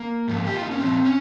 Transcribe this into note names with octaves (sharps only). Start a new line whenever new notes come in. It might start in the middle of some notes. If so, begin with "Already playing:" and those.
Already playing: A#3
G#2 F3
G4
F4
D#4
C#4
A#2 F3 C4
C#4